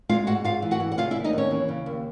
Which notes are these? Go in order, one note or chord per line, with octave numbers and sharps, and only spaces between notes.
G#3 F4 F5
G#2 F#4 F#5
G#2 F4 F5
E3
F#4 F#5
E3
F#5
C#3 F4 F5
E4 E5
D#2
D#4 D#5
D#2 C#4 C#5
E3
C#3
D#2